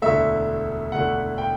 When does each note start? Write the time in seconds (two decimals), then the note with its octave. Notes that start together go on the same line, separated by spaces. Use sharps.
0.02 E1 D2 D3 A3 E5
0.92 E1 D2 D3 A3 F#5
1.38 G5